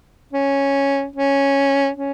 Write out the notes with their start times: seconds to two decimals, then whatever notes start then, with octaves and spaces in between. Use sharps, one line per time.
0.33 C#4
1.16 C#4
1.97 C#4